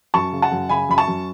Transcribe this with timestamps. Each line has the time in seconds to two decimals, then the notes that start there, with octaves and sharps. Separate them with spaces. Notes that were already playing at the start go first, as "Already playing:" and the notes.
0.14 F#2 A5 C#6
0.33 C#3
0.42 F#5 A5
0.52 F#2
0.69 C#3 G#5 B5
0.89 F#2 B5
0.98 A5 C#6
1.08 F#2